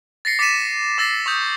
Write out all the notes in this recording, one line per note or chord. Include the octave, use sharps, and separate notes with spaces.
A6 A#6 C7 C#7
D6 A6 B6 C#7 D#7 E7
D6 E6 A6 A#6 C7
C#6 D#6 G6